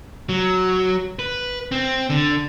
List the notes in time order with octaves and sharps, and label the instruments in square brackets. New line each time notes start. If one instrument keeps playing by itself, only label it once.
[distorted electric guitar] F#3
B4
C4
D3